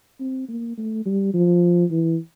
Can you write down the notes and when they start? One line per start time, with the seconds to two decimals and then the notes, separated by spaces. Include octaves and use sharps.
0.20 C4
0.48 A#3
0.78 A3
1.05 G3
1.34 F3
1.91 E3